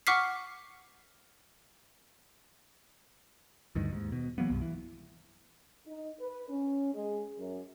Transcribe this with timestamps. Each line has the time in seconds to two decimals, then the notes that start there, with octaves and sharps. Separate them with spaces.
0.07 F#5 C#6 D6 F6 B6 C7
3.75 D2 G2 D#3
3.92 D#2 G#2
4.12 B2
4.38 E3 F#3 A#3 B3
4.50 C2 G2
4.61 E3
5.87 D#4
6.20 B4
6.49 C#4
6.94 G#3
7.39 F#2